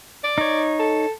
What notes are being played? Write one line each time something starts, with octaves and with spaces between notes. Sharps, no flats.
D5
D#4 C#5
A4